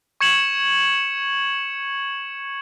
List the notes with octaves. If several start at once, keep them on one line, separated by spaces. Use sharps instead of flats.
C#6 G#6 C#7 E7 F#7